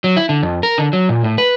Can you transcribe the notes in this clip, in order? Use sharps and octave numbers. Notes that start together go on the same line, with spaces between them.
F#3
E4
D3
F2
A#4
D3
F#3
A#2
A2
B4